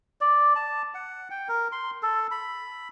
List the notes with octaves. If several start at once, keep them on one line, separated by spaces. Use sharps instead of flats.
D5
A5
F#5
G5
A#4
C6
A4
B5